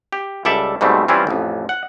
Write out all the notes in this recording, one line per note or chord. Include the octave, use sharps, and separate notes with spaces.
G4
C#2 G3 A4 D5 E5 A5
G#2 B2 G3 A3 C4
E3 G3 C4 C#4 E4 F4
A1 F2
F#5